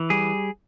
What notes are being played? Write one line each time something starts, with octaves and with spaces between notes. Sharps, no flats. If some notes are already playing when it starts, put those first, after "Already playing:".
Already playing: E3
G3 G#4